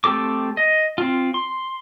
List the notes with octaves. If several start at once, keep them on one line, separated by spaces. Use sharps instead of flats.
A3 C4 G4 A4 D6
D#5
C4 F4
C6